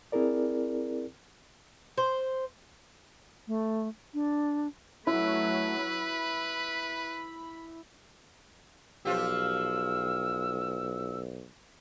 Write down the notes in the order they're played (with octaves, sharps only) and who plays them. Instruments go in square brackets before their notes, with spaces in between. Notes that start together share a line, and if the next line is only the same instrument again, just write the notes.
[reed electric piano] C4 E4 G#4 A#4 D5
[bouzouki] C5
[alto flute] A3
D4
[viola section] F#3 A3 [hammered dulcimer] E4 [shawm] B4
[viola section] B5
[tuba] B1 [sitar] F3 F4 G4 [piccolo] E6